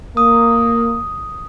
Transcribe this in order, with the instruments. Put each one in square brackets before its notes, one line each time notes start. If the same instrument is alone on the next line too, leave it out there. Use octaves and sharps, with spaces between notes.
[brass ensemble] A#3 [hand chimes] D#6